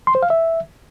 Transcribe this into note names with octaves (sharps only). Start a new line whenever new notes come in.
C6
C5
F5
E5